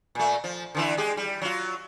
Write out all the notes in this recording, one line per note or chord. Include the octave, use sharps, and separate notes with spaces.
A#2 A3
F3
D3 E3 E4
G#3 G4
G3
F#3 F4